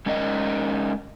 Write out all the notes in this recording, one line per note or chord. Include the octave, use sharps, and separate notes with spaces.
G#3 C#4 D#4 A#4 D#5